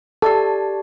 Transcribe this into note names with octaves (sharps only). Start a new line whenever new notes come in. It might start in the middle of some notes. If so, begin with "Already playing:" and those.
G4 A4 D5 A5